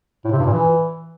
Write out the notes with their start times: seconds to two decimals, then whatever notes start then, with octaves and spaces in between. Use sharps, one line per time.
0.24 A2
0.32 C3
0.39 G2
0.46 A#2
0.53 E3